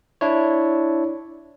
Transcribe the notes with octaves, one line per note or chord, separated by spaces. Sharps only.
D4 E4 C#5